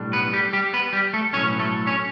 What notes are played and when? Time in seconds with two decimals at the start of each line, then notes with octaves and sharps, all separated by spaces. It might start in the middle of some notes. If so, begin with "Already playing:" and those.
Already playing: B1 A2 G3 D4
0.13 B3 B4
0.33 G3 G4
0.53 G3 G4
0.73 B3 B4
0.93 G3 G4
1.14 A3 A4
1.33 B1 A2 F#3 C#4 C#5
1.59 A3 A4
1.87 C#4 C#5